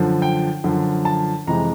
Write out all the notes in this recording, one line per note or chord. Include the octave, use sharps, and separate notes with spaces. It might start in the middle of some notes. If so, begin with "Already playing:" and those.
Already playing: F#2 D3 F3
G5
F#2 D3 F3
A5
F2 C3 E3 G#3 A#5